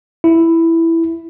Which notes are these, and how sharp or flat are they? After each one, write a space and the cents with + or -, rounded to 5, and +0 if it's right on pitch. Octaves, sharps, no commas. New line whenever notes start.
E4 +5